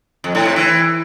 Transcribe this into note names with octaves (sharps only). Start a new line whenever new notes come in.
F2
A2
C3
E3